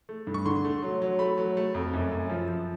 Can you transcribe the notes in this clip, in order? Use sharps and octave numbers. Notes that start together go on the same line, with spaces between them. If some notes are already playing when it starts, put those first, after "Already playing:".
A3
G2
C#6
D3 C6
A3
F#3
F#3
A3 B5
F#3
A3
F2
F#2
F#2
F3
F3